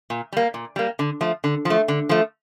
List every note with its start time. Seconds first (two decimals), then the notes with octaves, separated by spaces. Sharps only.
0.10 A#2
0.32 G3 A#3
0.54 A#2
0.76 G3 A#3
0.99 D3
1.21 F3 A3
1.44 D3
1.65 F3
1.70 A3
1.88 D3
2.09 F3 A3